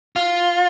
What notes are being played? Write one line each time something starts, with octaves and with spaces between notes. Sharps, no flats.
F4